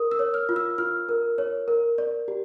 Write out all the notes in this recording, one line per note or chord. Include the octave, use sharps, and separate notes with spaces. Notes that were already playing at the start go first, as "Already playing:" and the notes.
Already playing: A#4 D#6
E6
C#5
F6
F4
E6
F4 F6
A#4
C#5
A#4
D5
G4